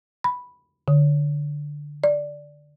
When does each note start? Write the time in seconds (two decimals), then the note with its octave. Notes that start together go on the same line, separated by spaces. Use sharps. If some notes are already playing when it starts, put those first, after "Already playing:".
0.24 B5
0.88 D3
2.04 D5